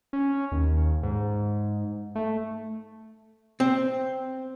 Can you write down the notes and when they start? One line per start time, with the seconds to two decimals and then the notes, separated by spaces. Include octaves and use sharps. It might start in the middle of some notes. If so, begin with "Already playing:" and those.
0.13 C#4
0.52 D#2
1.03 G#2
2.15 A3
3.60 C4